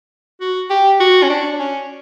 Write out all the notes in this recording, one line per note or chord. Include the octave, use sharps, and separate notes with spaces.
F#4
G4
F#4
C#4
D4
C#4